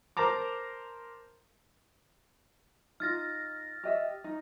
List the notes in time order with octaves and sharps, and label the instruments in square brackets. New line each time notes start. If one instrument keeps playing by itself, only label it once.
[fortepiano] A#4 C5 A5 A#5 D6
[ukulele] D#4 F4 [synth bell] F6 A6 A#6
[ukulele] G4 D#5 E5
D#4